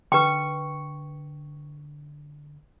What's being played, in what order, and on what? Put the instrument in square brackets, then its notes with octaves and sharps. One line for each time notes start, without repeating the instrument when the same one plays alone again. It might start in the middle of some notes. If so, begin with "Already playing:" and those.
[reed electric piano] D3 [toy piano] B4 G5 [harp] C#6